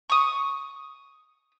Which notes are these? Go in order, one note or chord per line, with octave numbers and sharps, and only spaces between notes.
C#6 D#6